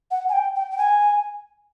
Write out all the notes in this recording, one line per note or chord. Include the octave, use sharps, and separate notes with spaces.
F#5
G#5
G5
G5
G5
G#5